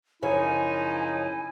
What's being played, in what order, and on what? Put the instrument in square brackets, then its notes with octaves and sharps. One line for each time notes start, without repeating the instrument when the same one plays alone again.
[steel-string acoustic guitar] F#2 C#3 C#5 [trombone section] F3 D#4 [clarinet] E4 [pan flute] G#5